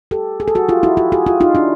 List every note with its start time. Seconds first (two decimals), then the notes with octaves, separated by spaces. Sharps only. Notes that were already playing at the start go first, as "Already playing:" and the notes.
0.11 G4 A4
0.40 G#4
0.48 A4
0.55 F#4 G#4
0.69 F4 G4
0.83 E4 F#4
0.97 F4 G4
1.12 F#4 G#4
1.26 F4 G4
1.40 D#4 F4
1.55 D4 E4